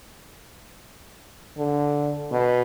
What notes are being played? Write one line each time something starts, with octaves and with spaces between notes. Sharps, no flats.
D3
B2